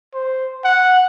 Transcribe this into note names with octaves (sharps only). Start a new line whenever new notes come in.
C5
F#5